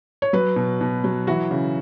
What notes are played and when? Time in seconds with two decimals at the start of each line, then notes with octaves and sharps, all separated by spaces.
0.22 C#5
0.33 F#3 B4
0.56 B2
0.81 B2
1.04 F#3
1.27 E3 F#4
1.51 C#3